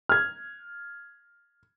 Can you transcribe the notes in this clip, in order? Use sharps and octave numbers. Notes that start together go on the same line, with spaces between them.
F6 G#6